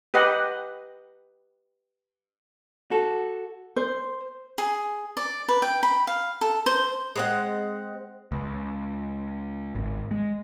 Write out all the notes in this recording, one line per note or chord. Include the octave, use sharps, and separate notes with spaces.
G4 B4 D#5 F#5
F#4 A4
C5
G#4
D5
B4
G5
B5
F5
A4
C5
G#3 C4 F#5
C#2
G#1
G#3